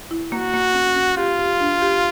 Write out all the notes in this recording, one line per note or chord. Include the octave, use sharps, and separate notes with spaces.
E4
A#3 F#4
A#3
C#4
C#4
F4 G4
G4
D4
G4